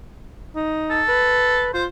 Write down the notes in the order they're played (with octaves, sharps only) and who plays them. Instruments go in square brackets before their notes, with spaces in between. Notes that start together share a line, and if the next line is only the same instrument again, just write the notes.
[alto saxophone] D#4
[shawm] A4
[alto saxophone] B4
[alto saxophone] F4 [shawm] C5